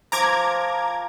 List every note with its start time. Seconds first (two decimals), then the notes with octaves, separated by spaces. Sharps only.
0.12 F3 A#4 A#5 D6 G#6